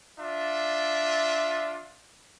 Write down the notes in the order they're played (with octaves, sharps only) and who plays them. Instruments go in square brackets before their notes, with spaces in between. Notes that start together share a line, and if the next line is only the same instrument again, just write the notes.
[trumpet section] D4 F4 E5